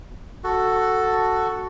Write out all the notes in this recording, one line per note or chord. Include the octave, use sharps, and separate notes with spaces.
F#4 A4